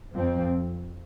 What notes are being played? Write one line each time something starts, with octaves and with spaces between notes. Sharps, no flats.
F2 F3 C4